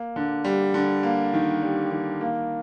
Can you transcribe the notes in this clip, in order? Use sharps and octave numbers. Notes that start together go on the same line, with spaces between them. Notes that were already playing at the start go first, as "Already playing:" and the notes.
Already playing: A#3
D3
G3
D3
A#3
D#3
G3
D#3
A#3